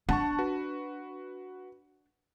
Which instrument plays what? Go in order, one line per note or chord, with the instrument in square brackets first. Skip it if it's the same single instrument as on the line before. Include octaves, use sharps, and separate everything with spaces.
[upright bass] D4 [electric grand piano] F#5 A5 C#6
[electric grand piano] F#4 B4